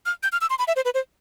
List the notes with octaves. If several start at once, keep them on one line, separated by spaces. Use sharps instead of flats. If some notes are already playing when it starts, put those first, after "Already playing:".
F6
G6
F6
E6
C6
B5
E5
C5
B4
C5